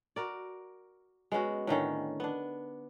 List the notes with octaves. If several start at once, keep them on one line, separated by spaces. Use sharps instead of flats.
F#4 A#4 D5
G#3 B3 C#4 F#4
A2 D3 D#3 C#4
B3 D4